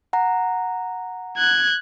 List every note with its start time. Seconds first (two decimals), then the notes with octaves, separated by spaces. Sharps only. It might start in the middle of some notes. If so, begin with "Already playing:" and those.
0.13 F#5 A#5
1.37 F#6 G#6